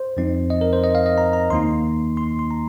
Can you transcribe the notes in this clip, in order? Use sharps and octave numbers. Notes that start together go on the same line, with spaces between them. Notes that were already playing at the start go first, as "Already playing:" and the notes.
Already playing: C5
F2 F3 C4 D#4
D#5
A#4
C5
D#5
F5
D#5
A#5
A#5
D#2 D#3 A#3 D#4 C6
C6
C6
A#5